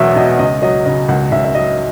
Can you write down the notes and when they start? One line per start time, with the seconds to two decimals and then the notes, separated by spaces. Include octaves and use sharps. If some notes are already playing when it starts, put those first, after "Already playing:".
Already playing: E1 E2 B2 F#3 E5
0.16 B2 D#5
0.39 C#2 D#5
0.62 F#3 D#5
0.85 C#3 D#5
1.08 C#2 F#5
1.32 C#2 E5
1.45 E5
1.55 F#3 D#5